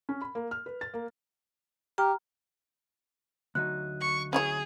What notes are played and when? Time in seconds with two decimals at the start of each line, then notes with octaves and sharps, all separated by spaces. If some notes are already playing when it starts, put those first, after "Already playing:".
0.09 C#4
0.22 B5
0.35 A#3
0.51 F6
0.66 B4
0.81 A6
0.94 A#3
1.98 G4 G5 A#5 F6
3.55 D2 F#3 D#4 F#6
4.01 C#6
4.33 C#4 E4 G#4 C#5